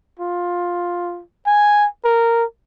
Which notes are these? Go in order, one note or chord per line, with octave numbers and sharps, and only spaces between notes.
F4
G#5
A#4